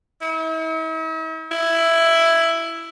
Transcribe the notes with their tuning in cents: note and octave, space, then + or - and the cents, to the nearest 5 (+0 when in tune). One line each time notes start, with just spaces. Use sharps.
E4 -45
E4 +5